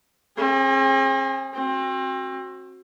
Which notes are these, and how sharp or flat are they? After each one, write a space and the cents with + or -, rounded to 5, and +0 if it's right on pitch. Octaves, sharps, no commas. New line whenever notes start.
C4 +45 G#4 +0
C4 +30 F#4 +0